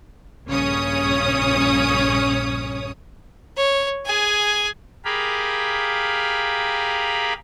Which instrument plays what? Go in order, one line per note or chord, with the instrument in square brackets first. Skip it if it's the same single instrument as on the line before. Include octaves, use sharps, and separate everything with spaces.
[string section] A#1 G2 C#3 C#4 C#5 D#6
[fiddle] C#5
G#4 G#5
[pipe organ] G4 G#4 A#4 F5 B5